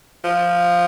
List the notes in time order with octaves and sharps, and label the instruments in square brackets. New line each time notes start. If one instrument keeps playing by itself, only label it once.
[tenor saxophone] F3